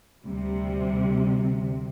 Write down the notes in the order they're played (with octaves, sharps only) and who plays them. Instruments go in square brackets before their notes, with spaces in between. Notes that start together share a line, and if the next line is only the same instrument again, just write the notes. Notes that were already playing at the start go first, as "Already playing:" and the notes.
[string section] D2 C3 G3